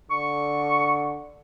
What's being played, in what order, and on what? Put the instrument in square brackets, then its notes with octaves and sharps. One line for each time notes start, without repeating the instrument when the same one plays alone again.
[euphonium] D3 [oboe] C#6